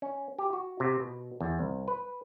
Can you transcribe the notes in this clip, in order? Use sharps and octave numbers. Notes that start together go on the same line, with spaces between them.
C#4
G4
F#4
C3
B2
E2
C2
B4